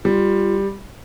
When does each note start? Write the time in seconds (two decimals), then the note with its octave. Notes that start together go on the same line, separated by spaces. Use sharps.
0.05 G3 F4